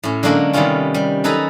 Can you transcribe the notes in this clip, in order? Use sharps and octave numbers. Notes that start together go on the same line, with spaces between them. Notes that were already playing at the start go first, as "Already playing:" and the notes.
A2 C#4
D3 F#3 G#3 A#3 C#4 D4
C3 D#3 G3 B3 C#4 F4
G3
F#3 D#4 A4 B4 G#5 A#5